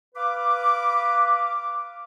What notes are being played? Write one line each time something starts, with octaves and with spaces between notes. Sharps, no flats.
B4 F5 D6